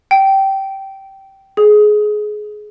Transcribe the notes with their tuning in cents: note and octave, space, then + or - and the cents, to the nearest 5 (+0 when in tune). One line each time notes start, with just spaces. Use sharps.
G5 -15
G#4 +20